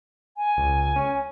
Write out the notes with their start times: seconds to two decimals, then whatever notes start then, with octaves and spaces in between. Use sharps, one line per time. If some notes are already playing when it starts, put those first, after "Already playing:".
0.36 G#5
0.57 C#2
0.96 C#4